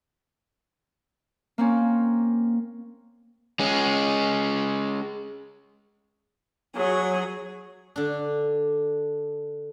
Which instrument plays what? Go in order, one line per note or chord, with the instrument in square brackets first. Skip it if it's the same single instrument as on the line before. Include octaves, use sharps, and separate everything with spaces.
[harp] A#3 C4 C#4
[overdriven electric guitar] G#3 C#4
[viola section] F#3 [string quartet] G#4 [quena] C#5
[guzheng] D3 D4